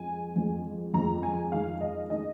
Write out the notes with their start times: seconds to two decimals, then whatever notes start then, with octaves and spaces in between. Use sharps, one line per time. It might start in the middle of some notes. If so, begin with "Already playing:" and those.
Already playing: F2 F3 G#3 G#5
0.36 F2 F3 G#3
0.94 F2 F3 G#3 A#5
1.23 G#5
1.52 F2 D#3 G#3 F5
1.81 D#5
2.10 D#3 G#3 D#5